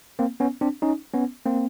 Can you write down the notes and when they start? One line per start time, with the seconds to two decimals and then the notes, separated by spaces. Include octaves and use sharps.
0.19 A#3 C4
0.40 B3 C#4
0.61 C4 D4
0.82 C#4 D#4
1.14 B3 C#4
1.46 A#3 C4